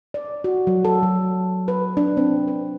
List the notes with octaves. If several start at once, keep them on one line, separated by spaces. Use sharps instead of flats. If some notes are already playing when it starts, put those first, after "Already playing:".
D5
F#4
F#3
A4
F#3
B4
D4
C4
B4